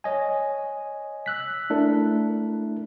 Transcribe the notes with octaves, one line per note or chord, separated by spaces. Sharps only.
C#5 D#5 G#5
E6 F#6 B6
A3 D4 E4 A#4